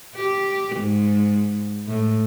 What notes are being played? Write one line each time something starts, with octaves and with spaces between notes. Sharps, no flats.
G4
G#2
A2